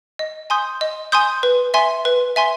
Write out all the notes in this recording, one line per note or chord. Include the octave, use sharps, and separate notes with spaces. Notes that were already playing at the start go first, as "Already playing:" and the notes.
D#5
G#5 C6 D#6 G6
D#5
G#5 C6 D#6 G6
B4
E5 G#5 C6
B4
E5 G#5 C6